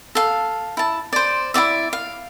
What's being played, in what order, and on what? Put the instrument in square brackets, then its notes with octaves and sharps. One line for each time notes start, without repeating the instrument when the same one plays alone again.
[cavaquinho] A4 F5
E4 A5
C5 D5
E4 F#4 D5 E5
F5